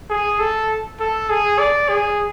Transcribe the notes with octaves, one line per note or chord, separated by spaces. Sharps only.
G#4
A4
A4
G#4
D5
G#4